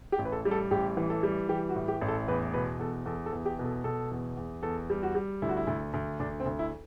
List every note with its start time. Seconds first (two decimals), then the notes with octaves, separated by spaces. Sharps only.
0.12 G4
0.19 A1
0.25 B4
0.32 A4
0.45 G3
0.51 A4
0.71 A1 G4
0.97 E3
1.10 A4
1.23 G3
1.49 E3 G4
1.69 F#4
1.76 A2
1.88 G4
2.01 A1
2.08 A4
2.28 E2 B4
2.54 B2 B4
2.80 E2 A4
3.06 E2 A4
3.26 A4
3.33 E2
3.46 G4
3.59 B2
3.65 A4
3.84 B2 A4
4.11 E2
4.37 E2
4.63 E2 A4
4.90 G3
5.03 F#4
5.15 G3
5.42 D2 E4
5.49 F#4
5.57 E4
5.67 D2
5.94 D2
6.20 D2 D4
6.40 C4
6.46 D2
6.59 E4